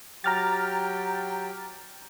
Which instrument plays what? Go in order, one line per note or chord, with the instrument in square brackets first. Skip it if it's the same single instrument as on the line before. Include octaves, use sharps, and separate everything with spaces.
[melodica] F#3 G4 G5 [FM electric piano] A#5 F6 A6